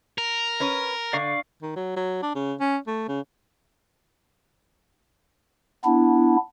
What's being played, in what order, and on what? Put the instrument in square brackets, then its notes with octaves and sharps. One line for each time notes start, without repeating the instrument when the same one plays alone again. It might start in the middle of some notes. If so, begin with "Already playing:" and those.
[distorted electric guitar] A#4
[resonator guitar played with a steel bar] C#4 B4 C#5
[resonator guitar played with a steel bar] D3 [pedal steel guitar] D5 F5 C#6
[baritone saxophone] D#3
F#3
F#3
D4
C#3
C#4
A3
C#3
[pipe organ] B3 D4 E4